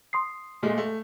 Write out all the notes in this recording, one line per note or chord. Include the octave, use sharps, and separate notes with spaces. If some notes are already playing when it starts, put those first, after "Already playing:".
C6 D#6 C7
A#2 G#3 A3
A3